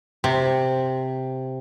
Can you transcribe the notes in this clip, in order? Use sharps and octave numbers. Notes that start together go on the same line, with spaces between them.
C3